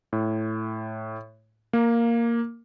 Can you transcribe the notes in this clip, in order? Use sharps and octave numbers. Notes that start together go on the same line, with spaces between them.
A2
A#3